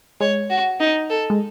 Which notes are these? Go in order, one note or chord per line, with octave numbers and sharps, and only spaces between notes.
G#3 C#5
F#4
D#4
A4
G#3